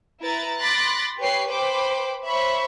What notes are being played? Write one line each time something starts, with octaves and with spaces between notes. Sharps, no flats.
E4 B4 A#5 A6
B5 C6 D6 F#6 A6 A#6
G4 B4 C#5 C7
B4 C5 G5 B5 D6
C5 C#5 E5 B5 C#6